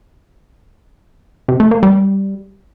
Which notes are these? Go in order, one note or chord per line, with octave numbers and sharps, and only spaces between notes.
C3
A3
A#3
G3